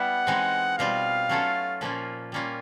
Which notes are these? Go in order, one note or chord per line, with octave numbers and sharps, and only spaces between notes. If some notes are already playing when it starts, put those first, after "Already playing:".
Already playing: G3 B3 E4 F#5
E3 G#3 C4 D#4
B2 G3 C4 F4 F5
F#3 A3 C#4 F4 A4
A#2 F3 A#3 C#4 F4
G3 A#3 C#4 F4